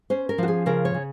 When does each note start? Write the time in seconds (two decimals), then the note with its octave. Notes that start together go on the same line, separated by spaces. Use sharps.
0.10 C#4 C5
0.29 A#4
0.38 F3 F#4
0.48 G#4
0.66 C#3 A#4
0.85 C#5
0.94 C#3